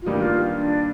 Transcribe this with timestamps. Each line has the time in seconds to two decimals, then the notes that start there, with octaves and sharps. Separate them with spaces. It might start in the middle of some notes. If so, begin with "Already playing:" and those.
0.02 F4
0.06 G2 D#3 G3 A#3 D#4 G4
0.22 F4
0.55 D4